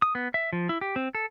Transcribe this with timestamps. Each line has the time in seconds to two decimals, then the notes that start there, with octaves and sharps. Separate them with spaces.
0.02 D#6
0.15 B3
0.34 E5
0.53 F3
0.69 E4
0.81 G4
0.96 C4
1.15 A4